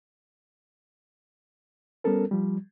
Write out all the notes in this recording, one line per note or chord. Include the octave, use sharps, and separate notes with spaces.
G3 B3 C#4 A4 A#4
F3 G3